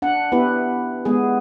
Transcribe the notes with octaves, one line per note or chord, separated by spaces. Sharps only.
D4 F#5
B3 E4 G4 B4
G#3 B3 G#4